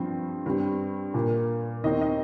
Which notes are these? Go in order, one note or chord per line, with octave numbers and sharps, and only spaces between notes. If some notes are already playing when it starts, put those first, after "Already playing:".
Already playing: G2 F3 C4
G2 G3 C4
A#2 A#3
D#2 D#3 C4 D#5
D#5